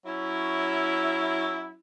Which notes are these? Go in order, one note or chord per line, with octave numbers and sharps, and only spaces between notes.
F#3 C#4 E4